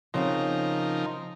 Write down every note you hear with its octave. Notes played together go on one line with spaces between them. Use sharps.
C#3 F3 C4 D#4 A#4 F5